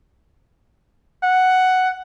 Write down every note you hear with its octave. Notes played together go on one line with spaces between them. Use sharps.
F#5